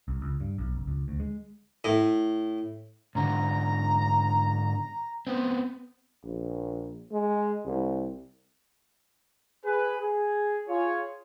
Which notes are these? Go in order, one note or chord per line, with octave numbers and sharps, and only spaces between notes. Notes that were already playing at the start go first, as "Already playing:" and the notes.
C2
C#2
G2
B1
F#1
C#2
D2
G#3
A2
G#2 D3 A#5
B3 C4
A#1
G#3
C2
G#4 B4
G#4
F4 G#4 C#5